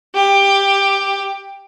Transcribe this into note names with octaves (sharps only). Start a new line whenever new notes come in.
G4